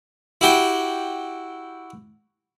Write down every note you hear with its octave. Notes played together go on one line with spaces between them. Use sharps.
E4 F#4 G4 G5